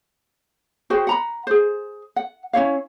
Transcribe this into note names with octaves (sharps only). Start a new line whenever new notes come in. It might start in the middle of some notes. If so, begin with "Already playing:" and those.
F#4 G#4 C5 G5
F#5 A#5 B5
G#4 C5
F#5
C#4 E4 C#5 F5